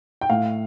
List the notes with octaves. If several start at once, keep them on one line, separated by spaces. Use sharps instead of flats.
G5
A2 F5